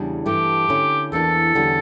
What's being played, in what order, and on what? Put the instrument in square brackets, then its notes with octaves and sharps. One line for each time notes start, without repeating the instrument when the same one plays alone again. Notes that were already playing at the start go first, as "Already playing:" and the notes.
Already playing: [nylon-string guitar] E2 C#3 G3 D4
[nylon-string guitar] G2 E3 A3 [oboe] G4
[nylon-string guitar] D3 A3 C#4 E4
[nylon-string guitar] E2 E3 A#3 D4 [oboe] A4
[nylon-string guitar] E2 D3 G3 C#4